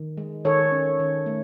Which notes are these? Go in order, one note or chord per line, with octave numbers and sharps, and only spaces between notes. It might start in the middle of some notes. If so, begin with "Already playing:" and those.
Already playing: D#3
G#3
D#3 A4 C#5
C#4
D#3
A3